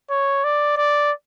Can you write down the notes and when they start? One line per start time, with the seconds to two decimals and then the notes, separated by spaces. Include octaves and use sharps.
0.10 C#5
0.44 D5
0.77 D5